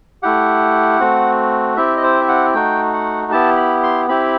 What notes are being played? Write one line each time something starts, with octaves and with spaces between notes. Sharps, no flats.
A3 E4 G4 F#5
A3 C4 F#4
C4 E4 G4 E5
D#5
C5
E5
F#5
A3 D#4 F#4 G5
F#5
B3 E4 G4 A5
B5
C6
C4 E4 G4 B5